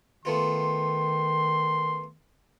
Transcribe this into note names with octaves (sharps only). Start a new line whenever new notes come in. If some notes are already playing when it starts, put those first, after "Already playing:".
D#3 A3 B3 F4 C6